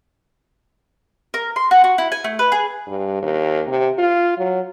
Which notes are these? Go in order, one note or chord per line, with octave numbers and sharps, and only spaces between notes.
A#4
C6
F#4
F#4
E4
G#5
A3
B4
G#4
G2
D#2
C3
F4
F#3